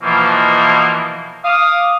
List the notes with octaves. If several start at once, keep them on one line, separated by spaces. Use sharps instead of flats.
B2 E3 F3 A#3
F5 D6 D#6